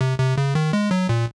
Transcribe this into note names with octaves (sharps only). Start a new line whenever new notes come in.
C3
C3
C#3
D#3
G#3
F#3
A#2